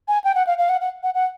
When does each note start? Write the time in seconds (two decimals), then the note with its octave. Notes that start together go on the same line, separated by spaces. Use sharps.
0.08 G#5
0.24 G5
0.35 F#5
0.47 F5
0.58 F5
0.69 F#5
0.81 F#5
1.03 F#5
1.14 F#5